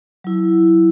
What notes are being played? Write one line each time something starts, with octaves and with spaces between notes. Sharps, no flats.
F#3 E4